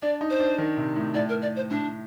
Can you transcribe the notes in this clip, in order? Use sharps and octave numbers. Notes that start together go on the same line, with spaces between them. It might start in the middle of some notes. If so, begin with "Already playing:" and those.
D4 D5
D#4
C5
D4
D#3
C3
A2
A2 D5
A#4
D5
C5
A2 D4